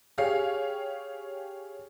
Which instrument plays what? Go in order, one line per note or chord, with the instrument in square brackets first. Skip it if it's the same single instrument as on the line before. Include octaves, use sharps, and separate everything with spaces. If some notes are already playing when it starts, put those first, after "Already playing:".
[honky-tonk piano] G4 G#4 C#5 F5 C7